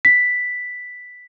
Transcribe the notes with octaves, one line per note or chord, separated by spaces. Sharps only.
B6